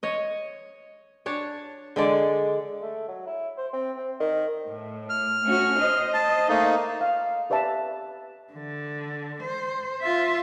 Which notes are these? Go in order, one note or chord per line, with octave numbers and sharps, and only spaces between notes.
C#5 D#5
D4 C#5 A5
D3 G#3 D5
A3
F#3
E4
C5
C4
C4
D#3
A2
F6
A3 C#4 F#4
C5 D#5
A5
A3 A#3 D#4
F5
G4 B4 D5 E5 A5
D3
C5
F4 E5